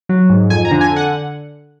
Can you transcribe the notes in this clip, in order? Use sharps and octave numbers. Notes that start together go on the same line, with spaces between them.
F#3
G#2
F2 G#5
A#5
D3
G#5
F#5